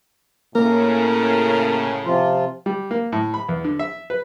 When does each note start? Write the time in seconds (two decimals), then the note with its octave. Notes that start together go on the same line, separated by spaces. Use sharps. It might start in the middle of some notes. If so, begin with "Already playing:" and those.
0.55 A2 C#3 A#3 A#4
2.05 C3 F3 F4
2.66 G3
2.91 A#3
3.12 A2
3.34 B5
3.49 E2
3.65 D3
3.79 E5
4.10 B4